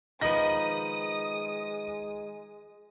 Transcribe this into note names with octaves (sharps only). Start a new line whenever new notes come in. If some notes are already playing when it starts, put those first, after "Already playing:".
D#3 F3 G#3 B4 D#5 D#6 A#6